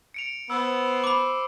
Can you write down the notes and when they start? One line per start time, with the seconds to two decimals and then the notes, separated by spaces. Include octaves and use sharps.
0.14 C#7 D7 F7
0.50 B3 C5 E6
1.04 B5 D6